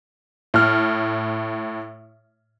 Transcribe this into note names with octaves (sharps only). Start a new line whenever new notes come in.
A2 F6